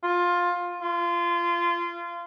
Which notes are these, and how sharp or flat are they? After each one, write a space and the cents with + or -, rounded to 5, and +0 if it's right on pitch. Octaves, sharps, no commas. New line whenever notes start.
F4 +15
F4 -25